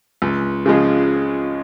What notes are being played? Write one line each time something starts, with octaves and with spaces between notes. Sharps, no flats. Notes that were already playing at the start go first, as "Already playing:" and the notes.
C#2
C#3 F3 G#3